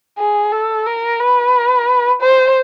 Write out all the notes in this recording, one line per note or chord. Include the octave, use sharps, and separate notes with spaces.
G#4
A4
A#4
B4
C5